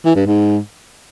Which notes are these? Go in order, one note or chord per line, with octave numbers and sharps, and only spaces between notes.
E3
G2
G#2